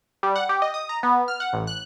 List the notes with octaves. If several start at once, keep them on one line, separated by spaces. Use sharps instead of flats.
G3
F#5
G4
D#5
D#6
A#5
B3
F6
F#5
A1
F#6